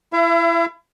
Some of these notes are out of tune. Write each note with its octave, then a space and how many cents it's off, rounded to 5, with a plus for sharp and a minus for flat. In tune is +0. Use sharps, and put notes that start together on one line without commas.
E4 +25 E5 +45